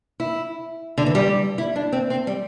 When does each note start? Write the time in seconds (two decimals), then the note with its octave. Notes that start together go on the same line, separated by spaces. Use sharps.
0.20 E4
0.98 D3
1.06 E3
1.15 G3
1.58 E4
1.76 D4
1.92 C4
2.10 C4
2.27 G3